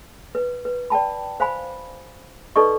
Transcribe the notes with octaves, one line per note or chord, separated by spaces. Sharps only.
B4
B4
D5 G5 A5 B5
C5 F5 G#5 B5
D#4 A4 B4 D5 D#5 C#6